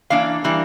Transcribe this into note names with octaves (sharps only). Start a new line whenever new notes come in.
E3 A#3 D4 F5
E3 G3 A#3 D4